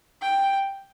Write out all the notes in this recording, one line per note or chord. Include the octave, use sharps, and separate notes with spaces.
G5